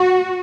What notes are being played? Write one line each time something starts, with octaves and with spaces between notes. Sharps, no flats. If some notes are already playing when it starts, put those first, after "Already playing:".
Already playing: F#4